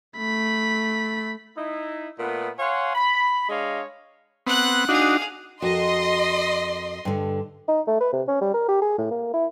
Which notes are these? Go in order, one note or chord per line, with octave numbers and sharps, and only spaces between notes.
A3 B5
D#4 E4
A#2 A3 B3
C#5 F5 F#5 G#5 C6
B5
G#3 D4 C#5 D#5 F5
B3 C4 F#5 F#6
D4 D#4 F#4 G#4 F5
F2 F#4 A#4 D#5 C6
G2 D3
D#4
A3
B4
C3
C#4
G3
A#4
G4
G#4
A2
A#3
E4